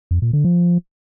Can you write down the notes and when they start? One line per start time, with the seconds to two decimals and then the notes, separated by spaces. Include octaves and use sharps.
0.11 F2
0.22 A#2
0.33 D3
0.45 F3